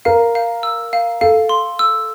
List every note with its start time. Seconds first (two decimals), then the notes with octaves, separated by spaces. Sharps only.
0.05 A#4 F5
0.35 F5
0.63 E6
0.93 F5
1.21 A4 F5
1.49 C6
1.79 E6